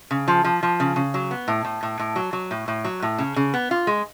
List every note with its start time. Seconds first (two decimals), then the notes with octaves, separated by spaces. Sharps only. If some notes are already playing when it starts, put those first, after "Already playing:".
0.11 C#3
0.28 F3
0.44 F3
0.63 F3
0.80 C#3
0.96 C#3
1.14 F#3
1.31 B3
1.48 A2
1.65 A2
1.83 A2
1.99 A2
2.16 F#3
2.33 F#3
2.51 A2
2.68 A2
2.85 F#3
3.02 A2
3.18 C#3
3.36 C#3
3.54 B3
3.71 F4
3.87 G#3